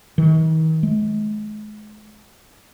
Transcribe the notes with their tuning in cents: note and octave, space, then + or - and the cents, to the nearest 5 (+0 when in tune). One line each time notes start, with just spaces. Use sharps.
D#3 +40
G#3 +35